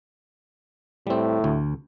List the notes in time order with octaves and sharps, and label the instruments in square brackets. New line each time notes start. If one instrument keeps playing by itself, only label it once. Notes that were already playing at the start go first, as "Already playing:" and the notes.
[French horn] A2 [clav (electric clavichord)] G3 C4
[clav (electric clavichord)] D2